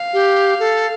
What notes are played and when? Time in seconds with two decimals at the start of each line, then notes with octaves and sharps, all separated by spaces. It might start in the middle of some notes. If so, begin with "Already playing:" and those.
Already playing: F5
0.14 G4
0.60 A4